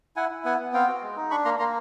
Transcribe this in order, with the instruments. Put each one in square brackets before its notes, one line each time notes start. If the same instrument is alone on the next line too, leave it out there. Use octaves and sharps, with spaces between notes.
[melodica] E4 F#5 G#5
E4
B3 F#5 G#5
B3
C4 F5 G5
F#4
G#3
D#4
D4 B5 C#6
A#3 A#5 C6
A#3 A#5 C6